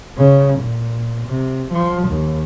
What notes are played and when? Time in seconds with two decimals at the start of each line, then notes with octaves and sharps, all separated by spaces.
0.18 C#3
0.59 A#2
1.27 C3
1.72 F3
2.08 D#2